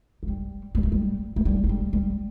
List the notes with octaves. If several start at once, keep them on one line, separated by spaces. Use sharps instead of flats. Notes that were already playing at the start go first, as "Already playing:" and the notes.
A3
G3
G3
A3
G3
A3
G3
F3
G3
G3